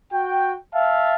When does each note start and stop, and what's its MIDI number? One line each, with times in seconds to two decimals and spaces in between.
0.12 0.53 66
0.12 0.53 79
0.74 1.15 76
0.74 1.15 77
0.74 1.15 81